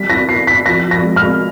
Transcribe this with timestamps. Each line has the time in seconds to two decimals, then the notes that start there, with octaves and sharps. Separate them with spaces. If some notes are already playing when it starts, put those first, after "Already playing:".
Already playing: G3 B6
0.10 E4 A#6
0.28 B3 C7
0.47 E4 B6
0.66 F3 A#6
0.85 F3
0.91 A#6
1.03 G#3
1.16 F6
1.23 G#3